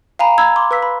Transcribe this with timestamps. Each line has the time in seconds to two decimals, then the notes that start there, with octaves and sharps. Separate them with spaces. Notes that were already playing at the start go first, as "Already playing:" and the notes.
0.19 F5 G#5 A#5 B5
0.38 A#5 B5 E6 G#6
0.56 C6 D6
0.71 B4 F5 E6 B6
0.83 B5